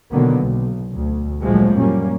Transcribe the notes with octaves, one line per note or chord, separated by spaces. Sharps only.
B2 D3 D#3 F#3 A#3 B3
B1
D2
A#1 A#2 F3 F#3 G#3 A3
F#2 A#2 G3 A#3 C#4